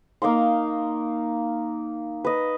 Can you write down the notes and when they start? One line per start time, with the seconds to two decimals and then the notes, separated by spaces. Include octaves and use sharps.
0.22 A#3 D#4 F5 C6
2.25 B4 D#5